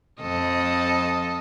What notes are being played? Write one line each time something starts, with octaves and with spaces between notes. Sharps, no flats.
F2 A4 D#5